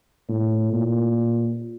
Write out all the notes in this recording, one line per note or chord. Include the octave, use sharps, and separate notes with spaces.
A2
A#2